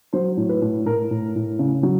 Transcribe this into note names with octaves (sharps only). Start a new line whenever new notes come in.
F#3 C5
A2
B4
A2
A2 A#4
A2
A2
C#3
F#3